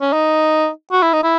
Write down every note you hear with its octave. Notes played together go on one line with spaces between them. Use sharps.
C#4
D#4
F#4
E4
D#4
E4